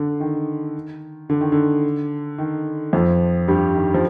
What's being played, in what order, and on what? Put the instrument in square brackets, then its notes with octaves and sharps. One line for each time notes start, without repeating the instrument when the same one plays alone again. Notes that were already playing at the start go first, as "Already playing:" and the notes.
Already playing: [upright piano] D3
D#3
D3
D#3
D3
D#3
F2 F3
G2 G3
D#3
F3